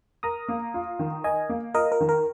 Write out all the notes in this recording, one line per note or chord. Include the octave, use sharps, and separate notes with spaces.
A#4 A#5 D#6
A#3
F4
D#3
A#4 D#5 G#5
A#3
F4 A#4 D#5
A#4
D#3
A#4